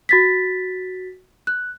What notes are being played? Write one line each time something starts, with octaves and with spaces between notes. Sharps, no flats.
F#4 A6 B6
F#6